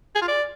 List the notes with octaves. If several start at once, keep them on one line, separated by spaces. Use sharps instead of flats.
G#4
F4
D5